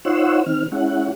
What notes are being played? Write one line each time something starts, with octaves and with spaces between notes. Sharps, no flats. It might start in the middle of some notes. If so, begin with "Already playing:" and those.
D#4 F4 C5 C#5 F#5 E6
D#3 C4 F6
G#3 C#4 E4 F#5